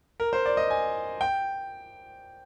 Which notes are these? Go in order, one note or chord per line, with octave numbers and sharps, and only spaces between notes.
A#4
C5
D5
D#5
G#5
G5